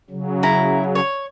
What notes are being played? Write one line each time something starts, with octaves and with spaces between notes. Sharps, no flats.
C#3 F#3
E4 A#5
C#5